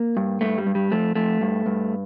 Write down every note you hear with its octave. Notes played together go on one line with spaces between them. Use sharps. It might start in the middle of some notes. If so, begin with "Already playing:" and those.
Already playing: A#3
G2
G2 A3
G3
G2
G3
F2 A3
F2 A3
G2
G2